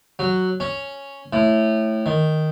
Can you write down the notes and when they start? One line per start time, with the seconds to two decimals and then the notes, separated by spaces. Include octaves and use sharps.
0.19 F#3
0.60 C#4
1.33 A2
2.06 D#3